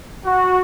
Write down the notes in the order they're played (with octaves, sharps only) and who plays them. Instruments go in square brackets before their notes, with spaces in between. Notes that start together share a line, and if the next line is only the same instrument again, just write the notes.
[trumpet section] F#4